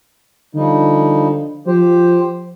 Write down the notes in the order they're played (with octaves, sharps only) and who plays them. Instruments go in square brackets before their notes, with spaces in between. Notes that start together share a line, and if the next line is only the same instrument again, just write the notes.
[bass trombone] D3 [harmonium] F3 G3 D#4
[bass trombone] F3 [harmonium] G4 C5